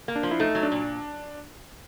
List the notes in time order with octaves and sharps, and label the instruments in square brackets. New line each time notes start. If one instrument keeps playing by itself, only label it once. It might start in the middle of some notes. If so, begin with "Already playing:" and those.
[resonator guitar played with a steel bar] A#3
[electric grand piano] D4
[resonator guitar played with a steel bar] F3
[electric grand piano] E4
[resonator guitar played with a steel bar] A3 [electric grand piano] D#4
[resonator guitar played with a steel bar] F#3
[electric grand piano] D4
[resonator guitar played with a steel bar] A#2